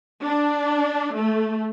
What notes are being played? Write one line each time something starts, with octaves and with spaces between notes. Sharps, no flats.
D4
A3